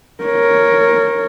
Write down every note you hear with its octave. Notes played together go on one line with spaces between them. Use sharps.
A#4 C#5